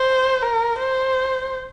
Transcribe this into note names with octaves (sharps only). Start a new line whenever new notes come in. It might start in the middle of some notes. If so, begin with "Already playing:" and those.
Already playing: C5
A#4
C5